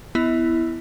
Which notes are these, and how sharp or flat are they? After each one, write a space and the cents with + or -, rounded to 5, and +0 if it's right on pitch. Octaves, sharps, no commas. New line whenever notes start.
B3 +15 E4 +0 E5 -45